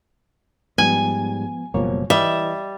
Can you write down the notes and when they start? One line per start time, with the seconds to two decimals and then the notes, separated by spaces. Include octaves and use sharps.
0.78 G#2 F3 G3 B3 G#5
1.74 F#1 B2 F3 G3 A#3 C#5
2.10 E3 G3 D#5 E5